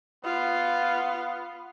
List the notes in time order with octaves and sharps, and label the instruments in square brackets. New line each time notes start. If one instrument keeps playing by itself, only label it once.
[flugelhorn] B3 [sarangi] F4